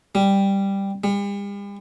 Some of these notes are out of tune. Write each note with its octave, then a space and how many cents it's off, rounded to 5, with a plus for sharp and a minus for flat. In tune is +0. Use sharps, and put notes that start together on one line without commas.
G3 +5
G3 +45